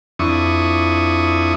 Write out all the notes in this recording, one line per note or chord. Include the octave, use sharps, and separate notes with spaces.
F2 D4 E4 C#6 D#6